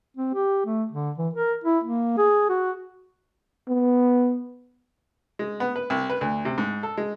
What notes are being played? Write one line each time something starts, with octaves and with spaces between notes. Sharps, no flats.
C4
G4
A3
D3
E3
A#4
E4
A#3
G#4
F#4
B3
G#3
B3
B4
C2
B4
D2
C3
G#2
A4
G#3